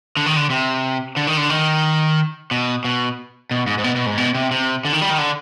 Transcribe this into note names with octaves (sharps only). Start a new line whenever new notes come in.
D3
D#3
D3
C3
D3
D#3
D3
D#3
B2
B2
B2
G#2
G#2
B2
B2
G#2
B2
C3
C3
D3
D#3
G3
D#3
D3